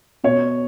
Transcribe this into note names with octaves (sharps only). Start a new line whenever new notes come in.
B2 C#5